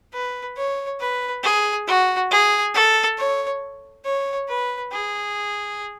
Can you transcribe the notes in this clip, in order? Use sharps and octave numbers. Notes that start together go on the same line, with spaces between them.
B4
C#5
B4
G#4
F#4
G#4
A4
C#5
C#5
B4
G#4